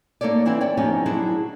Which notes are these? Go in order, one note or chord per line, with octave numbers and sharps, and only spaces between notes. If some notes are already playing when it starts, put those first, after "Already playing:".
A#3 D#4 A4 C#5 D5
E3 C4 E4 D5
C#5 D5 G5
F3 B3 C#4 D#4 G4
F#3 D4 E4 G#4